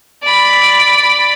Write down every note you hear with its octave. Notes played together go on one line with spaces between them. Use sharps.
D5 B5